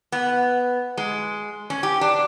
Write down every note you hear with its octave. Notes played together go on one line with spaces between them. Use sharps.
B3
G#3
C#4
G4
D4